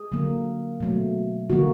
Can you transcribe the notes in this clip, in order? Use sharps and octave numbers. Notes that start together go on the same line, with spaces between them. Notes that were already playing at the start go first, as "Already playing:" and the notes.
Already playing: G#4
D3 F#3 A#3
B2 F#3 A3
D3 F3 A#3 F#4